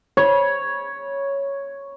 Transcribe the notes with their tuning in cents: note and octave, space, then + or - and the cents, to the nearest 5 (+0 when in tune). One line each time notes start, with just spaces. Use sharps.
C#5 +0 B5 -25